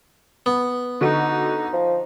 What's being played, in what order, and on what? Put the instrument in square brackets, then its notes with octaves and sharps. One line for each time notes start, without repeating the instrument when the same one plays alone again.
[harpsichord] B3
[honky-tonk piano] D3 F#4 [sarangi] D#4
[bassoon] F3